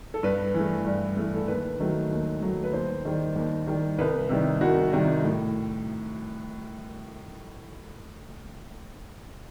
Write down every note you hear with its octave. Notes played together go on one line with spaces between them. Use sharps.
A4
G2 B4
E3 A3
G2
E3 A3
A4
D#2 B4
D#3 F#3 A3
D#2
D#3 F#3 A3
B4
D#2 C5
D#3 G3
D#2
D#3 G3
C2 B4
C3 D#3 G3
C2 F#4
C3 D#3 G3
A2